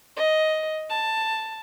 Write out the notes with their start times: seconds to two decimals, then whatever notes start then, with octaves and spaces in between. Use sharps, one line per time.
0.17 D#5
0.89 A5